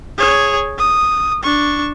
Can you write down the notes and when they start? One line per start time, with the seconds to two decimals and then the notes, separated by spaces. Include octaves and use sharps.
0.18 G#4 C#5
0.78 D#6
1.44 D4 C#6